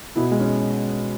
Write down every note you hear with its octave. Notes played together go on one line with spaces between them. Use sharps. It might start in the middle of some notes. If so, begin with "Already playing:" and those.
B2 E4
G#3
C#4